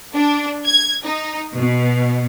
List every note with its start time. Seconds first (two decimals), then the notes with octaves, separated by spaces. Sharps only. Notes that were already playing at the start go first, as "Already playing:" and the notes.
0.14 D4
0.65 G#6
1.04 D#4
1.56 B2